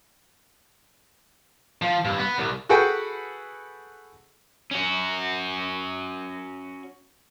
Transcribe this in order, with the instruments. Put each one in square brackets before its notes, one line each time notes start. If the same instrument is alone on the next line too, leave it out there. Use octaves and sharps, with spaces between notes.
[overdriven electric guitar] F3
G2
B3
C2
[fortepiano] F#4 G#4 A4 B4 F#5 G5
[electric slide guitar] C#4 F#4